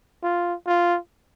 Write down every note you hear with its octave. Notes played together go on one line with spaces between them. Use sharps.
F4
F4